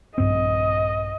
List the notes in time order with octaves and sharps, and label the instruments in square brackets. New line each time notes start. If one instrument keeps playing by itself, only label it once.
[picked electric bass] A#1 G2 C4 [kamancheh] D#5